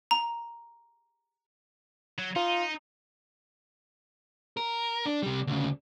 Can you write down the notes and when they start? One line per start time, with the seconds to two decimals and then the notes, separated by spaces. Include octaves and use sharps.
0.11 A#5
2.18 F#3
2.36 D#4 F4
4.57 A#4
5.06 D4
5.23 C3 G3
5.47 D2 C#3